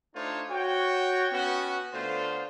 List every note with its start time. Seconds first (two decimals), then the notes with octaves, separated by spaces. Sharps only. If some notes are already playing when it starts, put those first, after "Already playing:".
0.14 A3 D4 D#4 F4 C5 C#5
0.49 F#4 C#5 G5
1.32 B3 C#4 F#4
1.93 D3 A3 B3 F4 C5